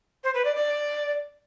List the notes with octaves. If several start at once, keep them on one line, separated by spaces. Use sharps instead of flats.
C5
B4
D5
D5